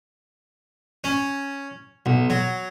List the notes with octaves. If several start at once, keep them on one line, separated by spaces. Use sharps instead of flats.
C#4
B1
F#3